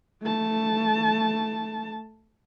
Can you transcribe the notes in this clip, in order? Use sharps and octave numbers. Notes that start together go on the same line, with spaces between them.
A3 A5